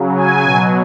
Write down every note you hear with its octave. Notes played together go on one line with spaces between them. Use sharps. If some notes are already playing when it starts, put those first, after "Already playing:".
Already playing: C#3 F#3
G#5
B2 F#3